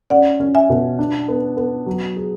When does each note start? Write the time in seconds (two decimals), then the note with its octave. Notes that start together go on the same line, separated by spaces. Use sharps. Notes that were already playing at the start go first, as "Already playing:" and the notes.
0.10 C#4 D5 F#5
0.40 C#4
0.55 E5 G#5
0.70 B2
0.99 D4
1.28 B3
1.57 B3
1.86 F#3
2.16 G#4